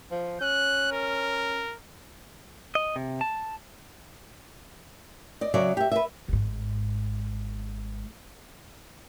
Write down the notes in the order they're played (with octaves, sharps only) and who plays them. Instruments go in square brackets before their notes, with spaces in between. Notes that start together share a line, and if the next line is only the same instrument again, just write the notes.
[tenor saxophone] F3
[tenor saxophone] C#4 [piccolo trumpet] F#6
[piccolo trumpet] A#4
[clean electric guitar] D#5
C3
A5
[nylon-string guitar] D5 D#5
C#3 F#3 D5 E5
G4 E5
B4 E5
[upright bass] G#1 G#2